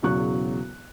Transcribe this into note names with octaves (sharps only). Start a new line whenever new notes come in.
E1 E2 C#3 F#3 C#6 F#6